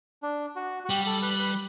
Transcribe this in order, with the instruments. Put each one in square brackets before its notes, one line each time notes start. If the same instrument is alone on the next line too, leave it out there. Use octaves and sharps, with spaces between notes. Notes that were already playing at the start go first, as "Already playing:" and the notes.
[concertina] D4
F#4
F#4
[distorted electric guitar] G3 [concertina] G4
[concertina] A4
B4
B4